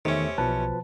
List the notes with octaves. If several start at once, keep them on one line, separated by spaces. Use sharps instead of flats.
E2 C3 D#3 A3 C#4
B1 B2 F3 B4 A5